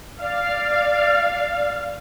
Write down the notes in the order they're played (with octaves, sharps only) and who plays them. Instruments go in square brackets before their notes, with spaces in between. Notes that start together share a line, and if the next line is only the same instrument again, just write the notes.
[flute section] D5 [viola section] F5